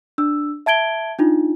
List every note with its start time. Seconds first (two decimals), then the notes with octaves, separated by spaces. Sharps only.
0.18 D4 E6
0.66 E5 A5 G#6 D7 G7
1.19 D4 D#4 F4